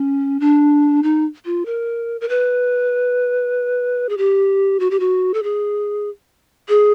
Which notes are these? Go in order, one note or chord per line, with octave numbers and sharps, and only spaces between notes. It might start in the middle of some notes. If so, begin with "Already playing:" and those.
Already playing: C#4
D4
D#4
F4
A#4
A#4
B4
G#4
G4
F#4
G4
F#4
A4
G#4
G#4